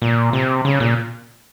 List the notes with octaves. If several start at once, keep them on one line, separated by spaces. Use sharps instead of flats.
A#2
C3
C#3
A#2